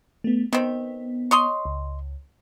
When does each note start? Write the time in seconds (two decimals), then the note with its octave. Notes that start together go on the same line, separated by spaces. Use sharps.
0.24 A3 B3
0.53 D#3 B3 C4
1.31 C#5 D#5 C6
1.65 C#2